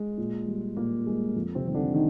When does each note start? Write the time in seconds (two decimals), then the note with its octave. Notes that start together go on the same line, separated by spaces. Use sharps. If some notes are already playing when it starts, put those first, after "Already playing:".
Already playing: G#3
0.17 A#2
0.48 G3
0.77 A#2 A#3
1.06 G3 G#3
1.36 F2
1.55 C3 C4
1.65 D#3 G3 C4
1.75 D3 D4
1.94 D#3 D#4